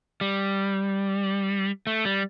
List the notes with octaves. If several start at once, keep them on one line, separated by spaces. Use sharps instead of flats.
G3
A3
G3